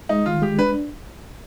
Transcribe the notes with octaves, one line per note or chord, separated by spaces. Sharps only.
G#3 D#4
D#3 F4
G#3 G4
D4 B4